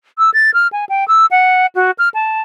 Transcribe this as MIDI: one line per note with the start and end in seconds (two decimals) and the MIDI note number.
0.18 0.30 88
0.34 0.51 93
0.54 0.68 89
0.72 0.85 80
0.89 1.07 79
1.08 1.26 88
1.31 1.66 78
1.75 1.91 66
1.99 2.09 89
2.14 2.41 81